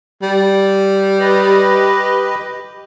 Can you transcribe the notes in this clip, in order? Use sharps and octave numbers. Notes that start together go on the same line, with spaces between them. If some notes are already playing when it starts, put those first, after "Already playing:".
G3
G4 B4 D#5